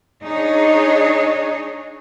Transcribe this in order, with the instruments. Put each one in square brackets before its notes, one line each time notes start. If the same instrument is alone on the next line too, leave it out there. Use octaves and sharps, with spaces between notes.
[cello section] D4 D#4 G#4 C#5 D#5